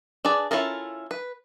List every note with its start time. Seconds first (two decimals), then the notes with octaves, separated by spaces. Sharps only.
0.25 D4 G#4 B4 D5
0.51 C#4 E4 F4 A4 A#4
1.11 B4